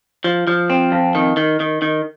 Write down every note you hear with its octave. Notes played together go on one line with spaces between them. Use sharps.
F3
F3
C4
F2
D#3
D#3
D#3
D#3